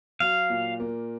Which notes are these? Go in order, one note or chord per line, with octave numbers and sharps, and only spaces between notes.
F#3 F5
A#2
A#3